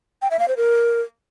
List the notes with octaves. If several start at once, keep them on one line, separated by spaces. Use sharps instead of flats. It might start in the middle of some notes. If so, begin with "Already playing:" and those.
G5
E5
F5
C5
A#4